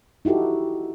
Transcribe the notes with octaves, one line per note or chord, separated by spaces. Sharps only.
D#4 E4 F#4 G4 A4